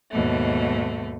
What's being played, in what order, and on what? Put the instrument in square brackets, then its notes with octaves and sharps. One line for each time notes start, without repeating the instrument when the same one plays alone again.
[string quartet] D#2 G#2 B2 A3